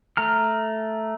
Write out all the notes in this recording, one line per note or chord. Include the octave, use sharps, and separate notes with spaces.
A3 A#5 F6